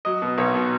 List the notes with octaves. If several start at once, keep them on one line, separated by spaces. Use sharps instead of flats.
F#3 D#5
B2
B1 C#5
B2